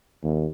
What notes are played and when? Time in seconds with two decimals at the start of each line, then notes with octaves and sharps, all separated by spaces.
0.23 D#2